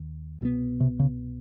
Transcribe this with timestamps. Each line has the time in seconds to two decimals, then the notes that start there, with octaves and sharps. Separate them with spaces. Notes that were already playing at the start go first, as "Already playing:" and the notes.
Already playing: D#2 D#3
0.41 C2 B2 G3 B3
0.80 C3
0.99 C#3